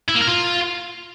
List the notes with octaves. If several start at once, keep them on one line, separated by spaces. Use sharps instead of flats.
E4
A#3
A#4
F4